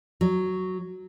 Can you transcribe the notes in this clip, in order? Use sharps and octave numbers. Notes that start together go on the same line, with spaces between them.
F#3